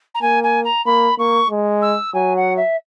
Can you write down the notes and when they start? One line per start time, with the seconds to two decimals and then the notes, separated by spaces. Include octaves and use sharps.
0.15 A#5
0.22 A#3 G#5
0.43 G#5
0.64 A#5
0.86 A#3 B5
1.19 A#3 C#6
1.50 G#3
1.82 E6
2.14 F#3 G#5
2.37 F#5
2.57 E5